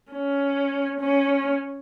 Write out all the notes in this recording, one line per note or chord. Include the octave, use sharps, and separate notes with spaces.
C#4
C#4